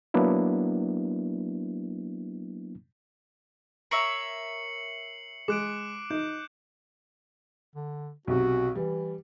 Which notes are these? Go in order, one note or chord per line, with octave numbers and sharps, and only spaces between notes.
F#3 A#3 B3 D4 E4
A#4 C#5 E5 C7 C#7 F#7
G#3 D6 F#6 D7
D#4 G6
D3
B1 C3 F#4
E3 G3